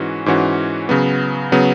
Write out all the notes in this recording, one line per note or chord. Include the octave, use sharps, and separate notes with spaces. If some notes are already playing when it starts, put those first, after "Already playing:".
Already playing: G#2 E3 C#4 F#4
G#2 E3 C#4 F#4
C#3 F#3 B3
C#3 F#3 B3